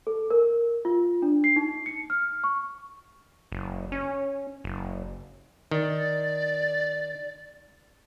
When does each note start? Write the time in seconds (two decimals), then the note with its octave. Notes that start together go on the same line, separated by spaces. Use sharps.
0.07 A4
0.31 A#4
0.85 F4
1.22 D4
1.44 C7
1.56 D#4
1.86 C#7
2.10 F6
2.44 C#6
3.52 F#1
3.92 C#4
4.64 F#1
5.71 D#3 D5